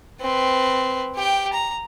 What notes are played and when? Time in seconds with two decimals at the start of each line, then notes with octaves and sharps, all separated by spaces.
0.21 C4 B4
1.16 G4 G5
1.53 A#5